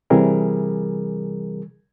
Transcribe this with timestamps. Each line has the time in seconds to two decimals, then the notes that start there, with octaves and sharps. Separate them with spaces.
0.10 C3 E3 G3 G#4 A#4